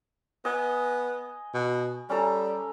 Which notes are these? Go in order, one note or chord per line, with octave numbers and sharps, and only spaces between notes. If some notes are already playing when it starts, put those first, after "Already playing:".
B3 D#5 G#5
B2
G3 C#4 A4 A#5